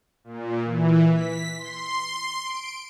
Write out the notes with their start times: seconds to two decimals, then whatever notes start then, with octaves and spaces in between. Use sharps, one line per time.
0.24 A#2
0.65 E3
1.13 B6
1.58 C6
2.45 D7